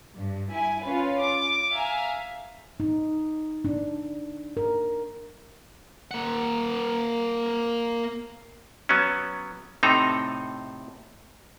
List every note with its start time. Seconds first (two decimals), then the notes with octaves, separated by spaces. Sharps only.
0.17 G2
0.52 E4 G#5
0.84 C#4 F4 B4
1.21 D6
1.71 E5 F5 G#5 A#5
2.80 D#4
3.65 D4
4.57 A#4
6.11 A#3 F#5
8.89 F#3 B3 C#4
9.83 A2 C3 C4 D#4 A4 A#5